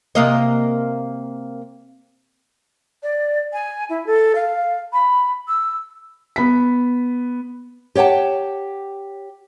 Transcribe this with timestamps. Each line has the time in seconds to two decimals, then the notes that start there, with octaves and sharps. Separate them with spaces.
0.15 C3 A#3 D#5
3.02 D5
3.53 G#5
3.89 E4
4.06 A4
4.35 F5
4.93 B5
5.48 E6
6.36 B3 B6
7.95 G4 C#5 F#5 G5 A5